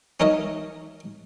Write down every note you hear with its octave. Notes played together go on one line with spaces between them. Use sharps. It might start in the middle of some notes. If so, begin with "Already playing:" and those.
C#4 D#4 A#4 C#5 D#5 E5